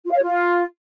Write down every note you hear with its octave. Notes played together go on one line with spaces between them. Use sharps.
F4
F5
C#5
F4